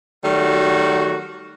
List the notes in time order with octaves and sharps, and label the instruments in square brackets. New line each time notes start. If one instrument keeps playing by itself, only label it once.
[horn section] D#3 F#3 G3 A3 F#4